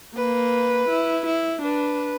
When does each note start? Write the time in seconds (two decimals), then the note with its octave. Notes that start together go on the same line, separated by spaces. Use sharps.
0.16 A#3 B4
0.89 E4
1.26 E4
1.62 D4 B4